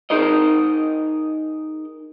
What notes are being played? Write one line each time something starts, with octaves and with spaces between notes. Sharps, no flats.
D#4 G#4 A#4 D#5